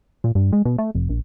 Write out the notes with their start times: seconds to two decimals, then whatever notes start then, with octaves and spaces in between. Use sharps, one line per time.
0.24 A#2
0.35 G2
0.53 G#3
0.65 B2
0.78 A3
0.95 F1
1.09 A#1